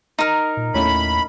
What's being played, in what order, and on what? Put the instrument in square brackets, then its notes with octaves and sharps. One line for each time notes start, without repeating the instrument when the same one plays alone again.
[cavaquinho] D#4 A#4
[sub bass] A#2
[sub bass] D#2 [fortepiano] A2 C#4 [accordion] B5